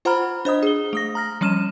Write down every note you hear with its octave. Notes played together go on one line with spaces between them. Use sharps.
F4 C5 F#5 A#5 B5 F6
D4 C5 D#5 D#6
G#4 G7
A3 D#6 A#6
A#5 F6 A#6
F3 G3 C#4 F6 D#7 E7